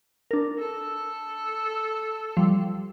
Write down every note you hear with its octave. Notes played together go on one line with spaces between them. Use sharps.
D4 A#4
A4
F3 G3